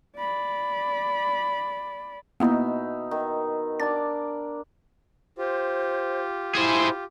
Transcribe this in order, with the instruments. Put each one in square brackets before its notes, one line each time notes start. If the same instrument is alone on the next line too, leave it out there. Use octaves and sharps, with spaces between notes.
[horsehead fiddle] D5 B5
[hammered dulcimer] B2 D#4 E5 [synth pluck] A#3 B3 E4
[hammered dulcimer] D#3
[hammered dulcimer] D4 A#4 D6 [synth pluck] A6
[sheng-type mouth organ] F4 G4 [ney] C5
[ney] E4 [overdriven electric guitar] G#4 C5